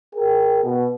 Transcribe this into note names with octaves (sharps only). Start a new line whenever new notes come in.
G#4 A#4 G5
B2